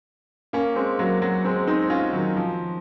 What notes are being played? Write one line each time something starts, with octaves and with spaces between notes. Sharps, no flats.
A#3 C#4
G#3 C4
F#3 A#3
F#3 A#3
G#3 C4
C4 D#4
C#4 F4
D#3 F#3
F3